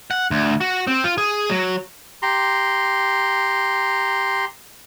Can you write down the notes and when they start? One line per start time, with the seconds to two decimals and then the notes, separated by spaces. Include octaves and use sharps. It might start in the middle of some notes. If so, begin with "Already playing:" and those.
0.11 F#5
0.31 D2
0.61 F#4
0.87 C4
1.04 F4
1.18 G#4
1.50 F#3
2.22 G4 A#5 C6